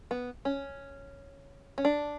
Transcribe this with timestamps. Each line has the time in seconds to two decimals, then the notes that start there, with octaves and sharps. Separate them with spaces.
0.11 B3
0.45 C#4
1.78 C#4
1.85 D4